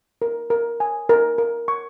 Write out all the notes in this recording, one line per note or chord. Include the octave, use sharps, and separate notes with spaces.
A#4
A#4
G#5
A#4
A#4
C#6